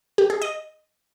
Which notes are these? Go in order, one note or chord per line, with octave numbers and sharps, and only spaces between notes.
G4
G#4
D#5